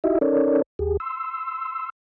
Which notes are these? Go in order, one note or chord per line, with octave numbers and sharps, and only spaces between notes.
D#4 E4 F#4 G4 D#5 E5
C#4 D#4 A4 A#4 C#5 D5
D#2 G4 G#4
C6 E6